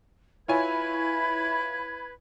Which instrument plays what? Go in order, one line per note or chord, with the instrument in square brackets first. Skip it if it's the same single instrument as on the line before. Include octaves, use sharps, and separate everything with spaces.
[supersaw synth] E4 [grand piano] F4 C#5 G#5 [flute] B4 [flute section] B5 G#6